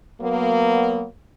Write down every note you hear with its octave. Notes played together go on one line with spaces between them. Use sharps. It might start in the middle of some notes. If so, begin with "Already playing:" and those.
F#3 A#3 B3